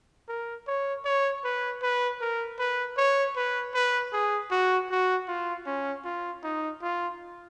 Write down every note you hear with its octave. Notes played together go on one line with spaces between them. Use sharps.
A#4
C#5
C#5
B4
B4
A#4
B4
C#5
B4
B4
G#4
F#4
F#4
F4
C#4
F4
D#4
F4